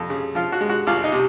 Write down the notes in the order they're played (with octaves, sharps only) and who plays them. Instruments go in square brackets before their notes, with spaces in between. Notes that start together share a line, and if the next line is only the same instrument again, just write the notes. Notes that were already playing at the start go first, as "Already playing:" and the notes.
Already playing: [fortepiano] F2
C#3
F3 F4
F#4
G#3
F#4
C2 F4
D#4
C3